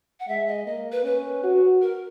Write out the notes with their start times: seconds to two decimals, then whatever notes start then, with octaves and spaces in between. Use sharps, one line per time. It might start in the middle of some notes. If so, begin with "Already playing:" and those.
0.20 F#5
0.28 G#3 E5
0.48 D#5
0.67 A#3 D#5
0.92 B4
1.05 C#4 B4
1.44 F#4
1.82 A#4